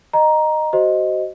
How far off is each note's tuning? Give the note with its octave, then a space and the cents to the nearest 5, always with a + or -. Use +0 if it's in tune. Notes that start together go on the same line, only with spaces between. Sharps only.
D#5 -15 A#5 +10
F#4 +30 C5 +0 D#5 +0